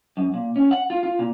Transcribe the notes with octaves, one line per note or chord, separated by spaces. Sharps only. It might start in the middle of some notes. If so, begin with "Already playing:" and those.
F#2
A#2
C#4
F#5
F4
F4
A#2